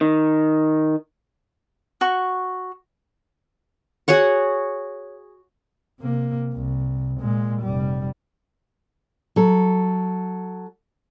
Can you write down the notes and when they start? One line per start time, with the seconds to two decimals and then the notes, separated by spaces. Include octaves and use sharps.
0.01 D#3
2.01 F#4 C#6
4.08 F#4 G#4 C#5 F#5
6.00 C3 A#3
6.54 C2
7.20 A#2 G#3
7.61 F1 G3
9.36 F#3 A4